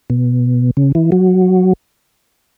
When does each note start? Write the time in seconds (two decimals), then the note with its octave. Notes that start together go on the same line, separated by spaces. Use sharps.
0.10 B2
0.77 C#3
0.95 E3
1.12 F#3